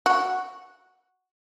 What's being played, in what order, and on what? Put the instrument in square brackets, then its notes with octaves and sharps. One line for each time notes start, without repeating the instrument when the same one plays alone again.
[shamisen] F#4